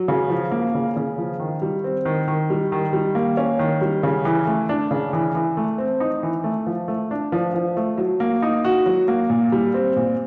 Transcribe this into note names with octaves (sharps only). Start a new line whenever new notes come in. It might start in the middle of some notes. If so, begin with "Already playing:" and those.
Already playing: F#3
C#3
F3
A#3
C#3
C#3
F3
D#3
G3
C4
D#3
D#3
G3
D#3
G3
A#3
C#4
D#3
G3
C#3
E3
A3
D4
C#3
E3
E3
A3
C4
D#4
E3
A3
F3
A3
D4
F3
F3
A3
F#3
A#3
D#4
F#4
F#3
A#3
A#2
G3
C4
A#2